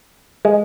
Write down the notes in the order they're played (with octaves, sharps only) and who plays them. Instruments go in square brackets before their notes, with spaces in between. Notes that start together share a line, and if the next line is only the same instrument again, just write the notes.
[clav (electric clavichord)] G#3